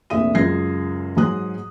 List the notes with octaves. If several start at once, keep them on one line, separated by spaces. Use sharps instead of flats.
F1 A#1 E5 D#6 D#7
C#2 F#2 F4 G#6 A#6 C7
G#2 F#3 G#4 D#6 F#6